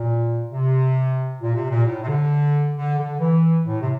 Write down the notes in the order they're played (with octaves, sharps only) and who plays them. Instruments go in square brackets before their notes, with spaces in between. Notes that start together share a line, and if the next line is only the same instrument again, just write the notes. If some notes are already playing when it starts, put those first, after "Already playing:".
Already playing: [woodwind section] A#2
C3
A#2
C3
A#2
A2
C3
D3
D3
D3
E3
A2
C3